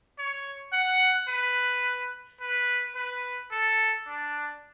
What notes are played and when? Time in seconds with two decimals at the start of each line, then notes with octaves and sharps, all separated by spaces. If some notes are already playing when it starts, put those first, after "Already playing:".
0.18 C#5
0.73 F#5
1.28 B4
2.41 B4
2.96 B4
3.52 A4
4.08 D4